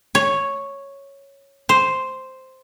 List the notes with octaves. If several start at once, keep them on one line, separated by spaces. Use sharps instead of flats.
C#5
C5